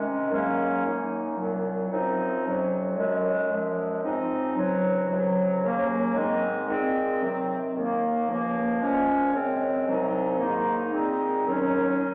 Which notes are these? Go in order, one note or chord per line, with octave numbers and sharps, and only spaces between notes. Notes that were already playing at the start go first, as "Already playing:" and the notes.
Already playing: C3 D#3 G#3 C#4
G#2 D#3 F#3 A#3 C#4
F#2 D#3 A#3 D#4
C2 A#2 F#3
F#2 F3 C4 D#4
F2 C3 F#3 C#4
F#2 D#3 G#3
F#2 F3 G#3
G#2 F3 C4 D#4
C#2 C3 F#3
C#2 C3 F#3
D#2 C#3 F#3 A#3 C#4
G#2 D#3 G#3 C4 D#4
A#2 G#3 C4
C3 D#3 F#3 C4
D#2 D#3 A#3
C#2 C#3 F3 A#3
A#2 F3 G#3 C#4
F#2 C#3 G#3 C4
C2 C3 F#3 C4 D#4
G#2 D#3 A#3 D#4
A#2 G#3 C4 D#4
D#2 D#3 F#3 C#4
D#4